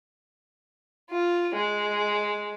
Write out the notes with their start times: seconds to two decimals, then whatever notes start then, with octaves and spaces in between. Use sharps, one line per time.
1.10 F4
1.55 G#3